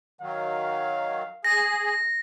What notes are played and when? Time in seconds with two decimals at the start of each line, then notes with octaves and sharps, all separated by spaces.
0.21 D#3 F#3 F5
1.44 G#4 A#6